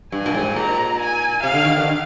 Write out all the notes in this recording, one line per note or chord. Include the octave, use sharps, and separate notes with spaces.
G2 G#5
A#2
G#2
A#2 A#5
G#5
C3 F5
D3
D#3
D3